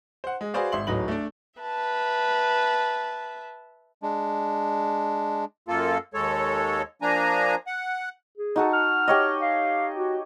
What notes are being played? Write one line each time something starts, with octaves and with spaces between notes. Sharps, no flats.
C5 F#5
G#3
F#4 G#4 B4 C5 D5 F5
G#1 E5 C6 F#7
D1 F#3 D#4 B4 F#7
A3 D4
B4 E5 A5
G#3 D4
F#2 A#3 F4 A4
D#2 G#3 A4 C#5
F3 A#3 D4 G#5 A#5
F#5
G#4
D#4 F#4 A4
F6
G4 C#5 D#5
F5
F#4